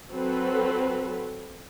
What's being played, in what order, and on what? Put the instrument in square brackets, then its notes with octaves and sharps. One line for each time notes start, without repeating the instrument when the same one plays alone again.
[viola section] F#3 C4 A4 B4